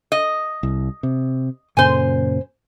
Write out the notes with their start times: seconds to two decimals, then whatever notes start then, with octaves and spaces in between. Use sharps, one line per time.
0.12 D#5
0.63 C2
1.03 C3
1.77 F#2 A#2 C#3 C5 G#5